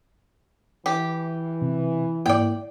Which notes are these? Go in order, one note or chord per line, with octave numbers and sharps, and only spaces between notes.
E3 G4
C3
G#2 A#3 E4 D5 G5